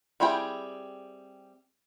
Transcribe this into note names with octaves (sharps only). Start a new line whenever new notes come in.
G3 C4 E4 G#4 G5